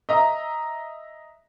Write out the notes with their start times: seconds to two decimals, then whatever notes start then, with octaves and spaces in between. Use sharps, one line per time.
0.09 D#5 E5 A#5 D#6